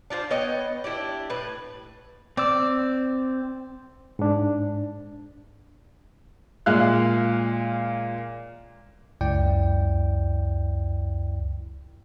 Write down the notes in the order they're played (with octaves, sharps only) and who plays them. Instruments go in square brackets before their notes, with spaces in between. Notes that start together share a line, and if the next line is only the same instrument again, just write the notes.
[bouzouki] D4 F4 G#4 C5
B3 C#5 D#5 G5
D4 E4 G4 D5
A2 B4
[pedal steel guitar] C4 E6 [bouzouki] D5
[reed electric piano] G#2 D4
[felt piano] A#2 G#3 F5 F#6
[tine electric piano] C#2 F#2 E4 D5 G5